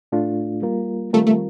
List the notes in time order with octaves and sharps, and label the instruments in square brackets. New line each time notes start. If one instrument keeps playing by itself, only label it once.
[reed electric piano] A2 A3 D4 F4
G3 A#3 F4 A#4
[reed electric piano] D#3 G3 C4 F4 A#4 [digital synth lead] A3
[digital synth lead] A3